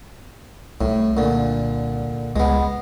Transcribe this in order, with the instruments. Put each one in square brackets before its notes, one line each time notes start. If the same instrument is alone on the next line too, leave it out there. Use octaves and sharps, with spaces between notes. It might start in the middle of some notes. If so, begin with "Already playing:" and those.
[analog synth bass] C2 [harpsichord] A2
[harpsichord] A#2 D3
[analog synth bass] C#2 [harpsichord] G#3 B3